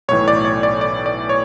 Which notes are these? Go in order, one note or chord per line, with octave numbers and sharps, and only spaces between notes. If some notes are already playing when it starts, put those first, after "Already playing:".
B1 A2 E3 C#5
D5
C#5
D5
D5
D5
C#5